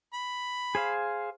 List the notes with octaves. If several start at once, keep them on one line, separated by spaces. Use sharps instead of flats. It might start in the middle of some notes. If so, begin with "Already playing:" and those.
B5
G#4 C5 F5